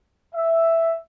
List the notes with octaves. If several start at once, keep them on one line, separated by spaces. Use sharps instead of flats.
E5